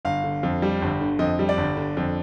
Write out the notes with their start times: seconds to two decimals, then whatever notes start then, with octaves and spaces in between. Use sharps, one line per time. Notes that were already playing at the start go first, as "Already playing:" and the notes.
0.05 G1 F5
0.24 D3
0.43 F2
0.62 G3
0.82 G1
1.01 D3
1.19 F2 D#5
1.39 G3
1.49 D5
1.58 G1
1.77 D3
1.97 F2